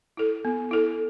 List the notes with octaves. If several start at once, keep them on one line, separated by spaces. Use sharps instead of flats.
E4 A4
B3
E4 A4